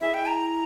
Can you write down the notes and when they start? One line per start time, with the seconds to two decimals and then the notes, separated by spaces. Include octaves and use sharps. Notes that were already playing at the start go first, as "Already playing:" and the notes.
0.01 E4 G#4 D#5 E5
0.14 G5
0.28 A#5